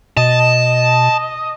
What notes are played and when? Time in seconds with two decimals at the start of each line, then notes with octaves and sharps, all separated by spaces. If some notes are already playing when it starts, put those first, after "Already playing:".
0.17 B2 D#5 A5